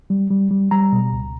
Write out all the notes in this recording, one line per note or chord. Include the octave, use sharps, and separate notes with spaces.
G3
G3
G3
G3 A#5
B2
C#2